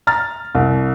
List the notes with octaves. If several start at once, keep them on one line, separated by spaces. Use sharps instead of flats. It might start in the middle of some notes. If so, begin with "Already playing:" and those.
A#5 F6 A6
C2